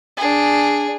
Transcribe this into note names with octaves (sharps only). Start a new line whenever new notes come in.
D4 G#4